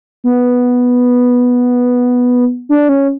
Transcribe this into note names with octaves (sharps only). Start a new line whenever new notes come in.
B3
D4
C#4